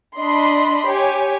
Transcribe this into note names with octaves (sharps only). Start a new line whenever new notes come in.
D4 D#5 B5 C6
G4 C#5 G#5